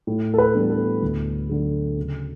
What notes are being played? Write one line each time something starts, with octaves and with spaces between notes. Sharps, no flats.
A2
A4
B4
E3 G3 B3 D4
A4
D2
D3 F#3 A3
C#3